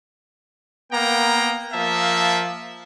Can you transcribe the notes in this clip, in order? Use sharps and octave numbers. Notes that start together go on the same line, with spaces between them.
A#3 B3 G5 A#5
F3 A#3 E5 A5